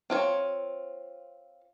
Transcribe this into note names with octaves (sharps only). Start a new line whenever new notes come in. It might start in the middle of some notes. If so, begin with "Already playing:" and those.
C4 F4 C#5